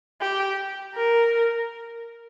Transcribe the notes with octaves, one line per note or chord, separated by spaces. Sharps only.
G4
A#4